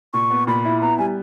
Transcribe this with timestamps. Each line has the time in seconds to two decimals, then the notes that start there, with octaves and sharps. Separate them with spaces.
0.14 A#2 C#6
0.30 B3
0.47 A#2 B5
0.65 E4
0.82 B3 A#5
0.98 G3 G#5